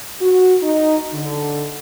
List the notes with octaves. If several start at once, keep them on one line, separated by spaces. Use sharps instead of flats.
F#4
D#4
D3